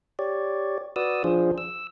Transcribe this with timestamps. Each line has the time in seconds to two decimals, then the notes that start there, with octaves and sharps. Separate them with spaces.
0.19 G4 C#5 D5
0.96 F#4 B4 D5 D#6 E6
1.24 F3 D4 F4 G#4 C5
1.58 E6